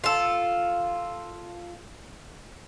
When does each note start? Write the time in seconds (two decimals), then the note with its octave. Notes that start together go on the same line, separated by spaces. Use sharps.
0.04 F4 A4